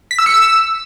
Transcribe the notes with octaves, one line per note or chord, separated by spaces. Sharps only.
B6
E6
C#7
E6